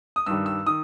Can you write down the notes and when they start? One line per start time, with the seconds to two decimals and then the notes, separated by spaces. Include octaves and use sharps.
0.16 D#6
0.26 G2 D#3 G3 E6
0.46 E6
0.66 D#3 D#6